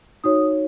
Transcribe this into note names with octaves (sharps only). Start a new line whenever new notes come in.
D#4 F#4 C#5 D#6